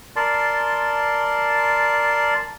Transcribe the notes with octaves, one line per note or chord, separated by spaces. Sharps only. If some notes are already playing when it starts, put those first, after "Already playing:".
A#4 D5 A5 C6